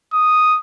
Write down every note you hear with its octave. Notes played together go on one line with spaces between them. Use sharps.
D#6